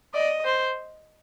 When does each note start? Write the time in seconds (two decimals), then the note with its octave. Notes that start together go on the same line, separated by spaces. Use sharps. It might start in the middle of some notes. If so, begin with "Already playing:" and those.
0.14 D5 D#5
0.45 C5